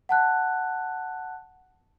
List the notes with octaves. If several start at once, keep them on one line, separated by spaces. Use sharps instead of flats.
F#5 A5 F#6